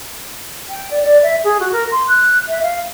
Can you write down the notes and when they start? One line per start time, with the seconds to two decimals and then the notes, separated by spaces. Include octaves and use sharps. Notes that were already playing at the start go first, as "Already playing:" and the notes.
0.69 G5
0.91 D5
1.04 D5
1.23 E5
1.44 G#4
1.60 F#4
1.72 A#4
1.91 C6
2.08 F#6
2.48 E5
2.63 F5